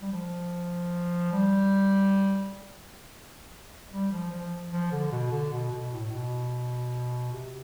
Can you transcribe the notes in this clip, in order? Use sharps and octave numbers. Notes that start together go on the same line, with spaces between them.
G3
F3
G3
G3
F3
F3
F3
D3
B2
D3
B2
B2
A2
B2
C3